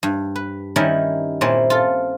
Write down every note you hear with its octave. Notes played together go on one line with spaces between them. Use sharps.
G2
B4
D#3 G3 C#4 D#4 E4 A#4
A#2 C4 C#4 E4
F4 A4